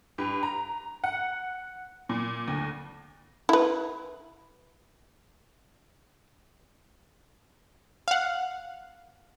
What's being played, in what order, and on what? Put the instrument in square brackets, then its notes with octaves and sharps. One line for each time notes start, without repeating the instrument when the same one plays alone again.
[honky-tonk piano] G2
A#5
F#5
A#2
D2
[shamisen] E4 B4
[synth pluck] F5 F#5